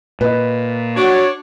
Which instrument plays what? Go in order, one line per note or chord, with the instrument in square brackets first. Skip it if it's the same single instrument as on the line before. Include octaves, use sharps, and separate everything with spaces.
[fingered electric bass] A#2 [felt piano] B4 D#5
[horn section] D4 C#5 [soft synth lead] F#4